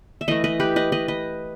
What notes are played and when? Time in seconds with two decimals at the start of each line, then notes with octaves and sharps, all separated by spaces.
0.21 E5
0.28 E3 A3 B4 D#5
0.44 B4 D#5
0.60 G4 B4
0.76 B4 D#5
0.92 B4 D#5
1.08 B4 D#5